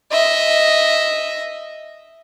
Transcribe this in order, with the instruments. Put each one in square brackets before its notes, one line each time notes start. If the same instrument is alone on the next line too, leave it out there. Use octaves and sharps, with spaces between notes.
[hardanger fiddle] D#5 E5